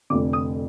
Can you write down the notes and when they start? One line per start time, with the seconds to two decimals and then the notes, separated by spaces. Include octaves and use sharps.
0.10 F1 F2 D3 D6
0.33 D#6